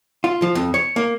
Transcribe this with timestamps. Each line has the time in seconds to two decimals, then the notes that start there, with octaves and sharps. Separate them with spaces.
0.24 F4
0.42 F3
0.55 F2
0.74 C#5
0.96 A#3